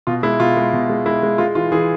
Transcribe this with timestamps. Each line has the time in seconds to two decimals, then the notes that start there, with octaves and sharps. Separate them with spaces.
0.07 B2 F4
0.23 G#3 E4
0.39 B2 F4
0.56 G#3
0.73 B2
0.90 G#3
1.05 G#3 E4
1.23 G#3
1.38 G#3 F4
1.55 E3 F4
1.72 E3 G#4